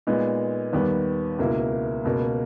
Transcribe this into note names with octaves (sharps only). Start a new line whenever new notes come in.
A#2 G#3 B3 D#4
D#2 D#3 G3 B3
C#2 B2 A#3 E4
C#2 B2 A#3